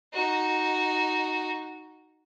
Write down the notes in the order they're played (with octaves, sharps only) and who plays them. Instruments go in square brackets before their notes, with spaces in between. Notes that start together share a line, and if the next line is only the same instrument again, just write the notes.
[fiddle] D#4 F#4